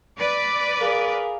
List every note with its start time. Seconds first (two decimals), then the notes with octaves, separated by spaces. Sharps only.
0.19 B4 D5
0.81 G#4 A#4 F5